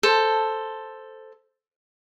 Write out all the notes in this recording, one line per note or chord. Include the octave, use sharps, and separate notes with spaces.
A4 C5